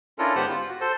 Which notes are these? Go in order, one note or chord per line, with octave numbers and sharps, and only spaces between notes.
C#4 D4 E4 F4 A4 A#4
G#2 D3 B3 G4 C5 F#5
F4
F#4
A4 C5